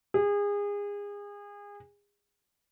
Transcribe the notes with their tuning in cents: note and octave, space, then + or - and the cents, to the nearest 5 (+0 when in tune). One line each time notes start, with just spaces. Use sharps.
G#4 -30